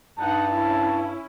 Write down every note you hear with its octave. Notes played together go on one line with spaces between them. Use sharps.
G2 D#4 F#5 A5
C#4 E4